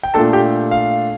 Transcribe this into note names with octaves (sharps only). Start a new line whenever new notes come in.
G5
A#2 A3 D4 A4 A5
G4 G5
F5